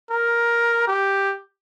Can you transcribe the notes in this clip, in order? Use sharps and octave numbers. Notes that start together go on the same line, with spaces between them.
A#4
G4